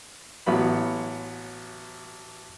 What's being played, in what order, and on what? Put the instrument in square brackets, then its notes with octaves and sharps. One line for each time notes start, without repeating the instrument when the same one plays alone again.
[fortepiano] A1 F#3 B3 B5